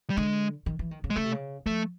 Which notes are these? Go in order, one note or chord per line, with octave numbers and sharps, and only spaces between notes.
G3
D3 G#3
D#3
E3
D#3
C#3
G#3
C#3 A3
C3
C#3
F3 A3